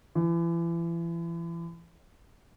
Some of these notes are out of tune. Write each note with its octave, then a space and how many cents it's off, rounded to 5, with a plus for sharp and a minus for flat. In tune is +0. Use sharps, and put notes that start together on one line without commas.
E3 +35